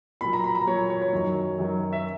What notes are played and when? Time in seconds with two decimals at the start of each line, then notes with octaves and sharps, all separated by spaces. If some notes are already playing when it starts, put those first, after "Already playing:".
0.21 A#2 F#3 B5
0.33 A#5
0.44 B5
0.55 A#5
0.67 A#2 F#3 C#5
0.90 C#5
1.02 C#5
1.13 F#2 D#3 F#3
1.58 F#2 D#3 F#3
1.93 E5